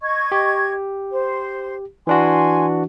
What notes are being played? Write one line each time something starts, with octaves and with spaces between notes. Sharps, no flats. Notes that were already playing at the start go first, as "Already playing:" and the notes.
D#5 C#6 G#6
G4
C5
E3 D4 F#4 G#5 C6